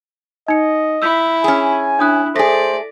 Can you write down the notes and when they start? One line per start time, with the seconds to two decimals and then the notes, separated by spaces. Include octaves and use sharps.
0.48 D#4 D#5 C#7
1.02 E4 E6 G6 B6
1.44 C#4 G#4 G#5
1.99 D4 E4 D#6 F#6
2.35 A3 G#4 A4 C5 D5 A#6 B6